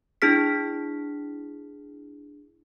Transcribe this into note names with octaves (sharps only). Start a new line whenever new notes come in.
D4 E4 G#4 F6 B6